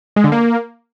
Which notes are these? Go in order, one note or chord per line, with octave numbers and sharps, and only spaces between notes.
G#3
D3
A#3